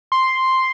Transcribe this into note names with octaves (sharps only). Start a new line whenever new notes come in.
C6